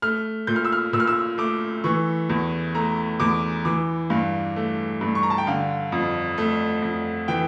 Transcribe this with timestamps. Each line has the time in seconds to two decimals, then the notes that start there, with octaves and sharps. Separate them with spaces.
0.02 A3 F6
0.47 A#2 G6
0.56 F6
0.65 E6
0.72 F6
0.93 A#2 E6
1.00 F6
1.07 E6
1.38 A3 D6
1.84 E3 C#6
2.29 E2
2.75 A3 A#5
3.20 E2 D6
3.65 E3 D6
4.10 G2 F5
4.56 A3
5.01 G2
5.15 C#6
5.23 A#5
5.30 A5
5.38 G5
5.47 D3 F5
5.92 F2
6.38 A3
6.82 F2
7.28 E3 G5